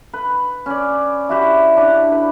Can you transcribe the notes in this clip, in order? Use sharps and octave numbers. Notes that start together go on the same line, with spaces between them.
B4
C#4 D5
E4 F#4 G4
D4
B4